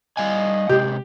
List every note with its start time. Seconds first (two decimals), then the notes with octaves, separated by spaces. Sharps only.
0.17 G3 D#5 F5 G#5
0.69 C3 G#3 G4